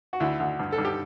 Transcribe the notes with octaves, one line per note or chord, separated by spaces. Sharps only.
F#4
D2 E4
D2
G2
A4
G2
G4